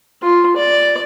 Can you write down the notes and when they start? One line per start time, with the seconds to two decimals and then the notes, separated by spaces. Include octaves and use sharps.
0.22 F4
0.56 D5